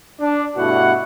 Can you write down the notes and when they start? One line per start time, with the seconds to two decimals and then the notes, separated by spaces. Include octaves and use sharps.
0.20 D4
0.56 G2 B2 A3 E4 F#4 F#5